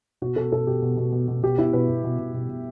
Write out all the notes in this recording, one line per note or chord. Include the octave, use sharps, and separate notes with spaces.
B2 F#4
B2 A4
B2 A4
B2 G4
B2
B2
B2
B2
B2 G4
B2 E4
B2 B4
B2
B2
B2
B2
B2